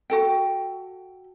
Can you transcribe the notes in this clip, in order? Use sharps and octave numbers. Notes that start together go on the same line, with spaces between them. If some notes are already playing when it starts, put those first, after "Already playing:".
F#4 A4 G5